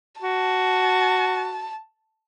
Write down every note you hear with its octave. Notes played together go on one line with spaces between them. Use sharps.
F#4 A5